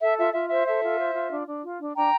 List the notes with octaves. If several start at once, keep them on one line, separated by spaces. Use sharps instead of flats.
A4 E5
F4 E5
F4 E5
C5 E5
A4 E5
F4
C5
F4
D4
D4
F4
D4
D4 G5 A#5